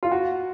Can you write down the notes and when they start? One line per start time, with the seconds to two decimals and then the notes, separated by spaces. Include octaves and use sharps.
0.03 F4
0.12 F#4